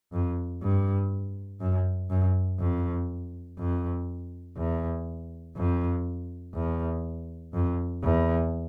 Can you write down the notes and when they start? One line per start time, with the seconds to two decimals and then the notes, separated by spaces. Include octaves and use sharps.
0.13 F2
0.62 G2
1.60 F#2
2.10 F#2
2.59 F2
3.58 F2
4.57 E2
5.56 F2
6.54 E2
7.53 F2
8.03 E2